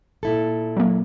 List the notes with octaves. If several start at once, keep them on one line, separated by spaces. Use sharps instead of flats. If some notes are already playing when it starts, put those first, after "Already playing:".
A#2 E4 A4
F#3 A#3